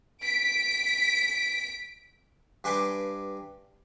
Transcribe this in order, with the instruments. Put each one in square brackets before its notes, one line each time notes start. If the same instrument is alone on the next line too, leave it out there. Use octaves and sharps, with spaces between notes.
[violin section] B6 D7
[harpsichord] G2 G4 B4 G#5 C6 D6